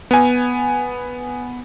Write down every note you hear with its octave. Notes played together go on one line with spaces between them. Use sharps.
B3 G#5